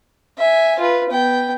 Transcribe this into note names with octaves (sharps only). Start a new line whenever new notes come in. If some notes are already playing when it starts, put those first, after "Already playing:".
E5 G#5
F4 B4
B3 G5